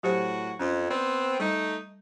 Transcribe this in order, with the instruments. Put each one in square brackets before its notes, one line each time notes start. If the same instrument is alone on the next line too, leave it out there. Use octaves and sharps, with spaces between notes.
[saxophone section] A2 F#4 [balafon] F#3 G4 C5
[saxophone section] F2 [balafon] C#4
[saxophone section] B3 C4 [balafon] D5
[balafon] G3 [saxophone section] A3 D#4